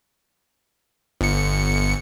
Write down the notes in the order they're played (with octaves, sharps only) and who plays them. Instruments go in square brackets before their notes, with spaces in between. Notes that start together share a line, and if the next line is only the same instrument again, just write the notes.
[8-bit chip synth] G1 C#7